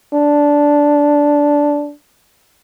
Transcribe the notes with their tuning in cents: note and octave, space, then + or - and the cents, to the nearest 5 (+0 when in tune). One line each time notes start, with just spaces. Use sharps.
D4 -10